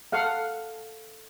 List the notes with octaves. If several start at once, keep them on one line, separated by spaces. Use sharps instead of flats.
A4 F5 F#5